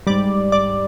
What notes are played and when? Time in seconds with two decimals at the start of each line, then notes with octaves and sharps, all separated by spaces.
0.07 G#2 G3 D5
0.52 D5